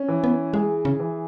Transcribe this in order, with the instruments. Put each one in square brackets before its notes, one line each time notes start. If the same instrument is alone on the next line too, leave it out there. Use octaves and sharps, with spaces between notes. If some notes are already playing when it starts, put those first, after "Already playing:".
Already playing: [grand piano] C#4
E3
[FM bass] B3
[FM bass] G#3 [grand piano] G#4
[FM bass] C#3
[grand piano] E3